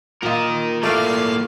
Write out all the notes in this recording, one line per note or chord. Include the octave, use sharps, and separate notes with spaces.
A#2 F4 A#4 D#5
A2 A3 A#3 D5 F5